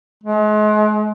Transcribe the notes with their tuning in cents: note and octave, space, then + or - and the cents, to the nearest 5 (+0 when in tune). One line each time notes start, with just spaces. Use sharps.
G#3 +35